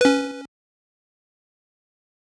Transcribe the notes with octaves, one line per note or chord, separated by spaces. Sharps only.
C#4 B4